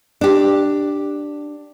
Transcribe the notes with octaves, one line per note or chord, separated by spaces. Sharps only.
D4 G4